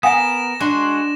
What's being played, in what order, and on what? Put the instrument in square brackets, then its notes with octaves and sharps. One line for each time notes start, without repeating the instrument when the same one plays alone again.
[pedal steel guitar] B3 A#4 [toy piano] F#5 G#5 D#6 [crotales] A#6 E7
[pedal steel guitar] G#3 F#4 C6 [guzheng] D4